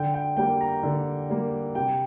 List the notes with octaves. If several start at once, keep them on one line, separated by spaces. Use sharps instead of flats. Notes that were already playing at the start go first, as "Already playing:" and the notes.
Already playing: D3 G5
G5
G3 A#3 G5
A#5
D3
G3 A#3
C3 G5